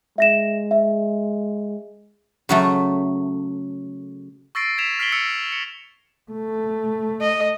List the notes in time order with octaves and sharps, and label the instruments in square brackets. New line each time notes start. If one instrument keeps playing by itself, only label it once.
[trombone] G#3 [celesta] E5 A#6 E7
[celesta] E5
[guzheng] C#3 F#3 A3
[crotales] C#6 E6 A6 A#6 C7 D7
G#6 B6 E7 F7
F6 B6 C7 D7 F#7 G7
E6 F6 A#6 C#7 F7
C#7
[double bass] A3
[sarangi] D#5